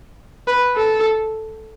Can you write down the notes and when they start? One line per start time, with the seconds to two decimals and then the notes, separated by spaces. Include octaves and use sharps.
0.47 B4
0.76 A4